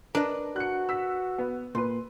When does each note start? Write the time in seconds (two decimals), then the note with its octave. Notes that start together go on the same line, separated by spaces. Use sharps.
0.15 D4 A#4 B4 D#5
0.56 F#4 F#6 C#7
0.89 E6 B6
1.38 B3
1.75 A#2 B4 C6